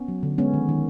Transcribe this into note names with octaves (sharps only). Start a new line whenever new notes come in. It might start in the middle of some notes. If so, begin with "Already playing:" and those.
Already playing: B3 C#4
F#3
D3
G#3 B3 C#4
D#3
D#3